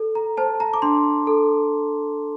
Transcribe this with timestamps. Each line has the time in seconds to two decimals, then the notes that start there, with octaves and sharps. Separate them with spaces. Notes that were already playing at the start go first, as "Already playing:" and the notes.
Already playing: A4
0.15 A#5
0.37 C5 A5
0.60 A#5
0.74 D6
0.82 D4 C6
1.27 A4